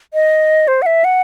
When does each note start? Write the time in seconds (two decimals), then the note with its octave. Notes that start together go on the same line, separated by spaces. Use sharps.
0.14 D#5
0.68 C5
0.82 F#5
0.86 E5
1.04 F#5